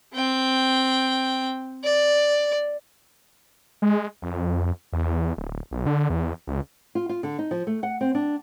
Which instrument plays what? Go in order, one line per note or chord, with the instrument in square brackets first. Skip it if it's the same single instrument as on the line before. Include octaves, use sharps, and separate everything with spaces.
[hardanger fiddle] C4 G5
D5
[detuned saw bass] G#3
F2
E2
D1
B1
D3
E2
C#2
[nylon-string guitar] F4
F4
D3
D#4
F3
A3
F#5
C4
D4